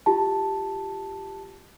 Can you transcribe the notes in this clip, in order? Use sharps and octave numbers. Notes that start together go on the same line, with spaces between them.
F4 G4 A5